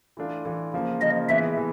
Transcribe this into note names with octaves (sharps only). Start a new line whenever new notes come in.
E3 A3 D4 F4
E3 A3 D4 F4
C#3 F3 A#3
C#3 F3 A#3 D#5
E3 G#3 B3 E5
E3